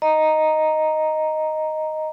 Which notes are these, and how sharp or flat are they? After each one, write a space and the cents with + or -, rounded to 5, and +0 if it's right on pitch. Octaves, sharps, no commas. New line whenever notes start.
D#5 +0 A#5 +0